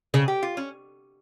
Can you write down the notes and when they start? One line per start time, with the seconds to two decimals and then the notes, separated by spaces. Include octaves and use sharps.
0.14 C#3 G#4
0.28 G4
0.43 F4
0.57 C#4